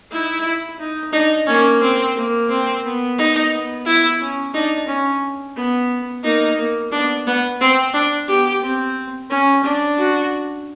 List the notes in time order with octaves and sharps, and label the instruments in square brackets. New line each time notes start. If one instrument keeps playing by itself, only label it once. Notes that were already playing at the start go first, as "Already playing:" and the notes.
[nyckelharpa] D#4 [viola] E4
[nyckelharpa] E4
D#4
[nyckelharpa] D4 [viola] D#4
[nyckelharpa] A#3 [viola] C#4
[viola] C4
[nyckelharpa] A#3
[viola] C4
[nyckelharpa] B3
[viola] D#4
[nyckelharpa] B3
[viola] E4
[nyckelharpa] C#4
[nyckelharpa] D4 [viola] D#4
[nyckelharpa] C#4
B3
[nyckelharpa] A#3 [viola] D#4
[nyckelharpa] A#3
[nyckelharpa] B3 [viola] D4
[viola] B3
C4
D4
[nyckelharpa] B3 [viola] G4
[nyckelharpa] C4
C#4
D4
[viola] F#4